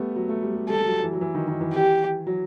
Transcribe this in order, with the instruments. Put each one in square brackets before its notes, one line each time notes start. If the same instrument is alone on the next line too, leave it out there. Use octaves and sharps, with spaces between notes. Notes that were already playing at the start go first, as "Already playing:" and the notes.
Already playing: [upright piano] G3 A3 B3
F#3
A3
G3
G3
[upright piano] G3 [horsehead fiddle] A4
[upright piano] G3
F#3
E3
F#3
E3
D#3
D#3
E3
[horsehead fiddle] G4
[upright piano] F#3